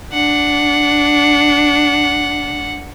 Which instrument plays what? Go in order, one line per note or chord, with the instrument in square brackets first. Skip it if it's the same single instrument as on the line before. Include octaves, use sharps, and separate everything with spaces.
[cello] D4 [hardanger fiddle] F#5